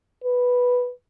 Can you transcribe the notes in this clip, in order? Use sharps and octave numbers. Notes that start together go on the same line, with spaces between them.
B4